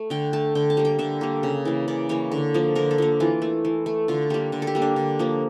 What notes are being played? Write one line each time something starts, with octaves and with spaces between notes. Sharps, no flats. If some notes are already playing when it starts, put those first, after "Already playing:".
Already playing: A3
D3 G5
A3 A5
D3 G5
A5
G3 A#3
G5
D3 E5
G3 A#3
C#3
E3 A#3
C#3 D5
E3 A#3 C#5
D3
F3 A#3
D3 A#4
A4
F3 A#3
E3 F4
A3
E3
A3
D3 F4
G3 A#3 G4
D3
A4
G4
G3 A#3
D4
D3
F3 A#3